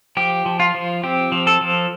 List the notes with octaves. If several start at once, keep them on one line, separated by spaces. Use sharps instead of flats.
F3 G4
F3
F4
F3
C4 G4
F3
A4
F3